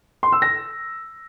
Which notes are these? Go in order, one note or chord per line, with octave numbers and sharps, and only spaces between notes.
C6
E6
A#6